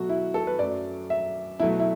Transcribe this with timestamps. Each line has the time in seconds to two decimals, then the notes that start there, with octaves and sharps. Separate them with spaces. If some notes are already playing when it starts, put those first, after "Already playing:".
Already playing: B2 F#3 A3 F#4
0.09 E4
0.34 A4
0.47 B4
0.59 F#2 F#3 A3 D5
1.10 E5
1.59 B2 F#3 A3 E4
1.80 E4